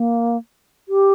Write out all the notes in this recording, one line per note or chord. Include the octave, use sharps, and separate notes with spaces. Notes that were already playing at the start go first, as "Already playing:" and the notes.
Already playing: A#3
G4